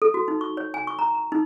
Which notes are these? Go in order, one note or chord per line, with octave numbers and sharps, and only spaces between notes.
A4
F#4
D#4
C#6
C#5
G#5
C#6
A#5
A#5
D#4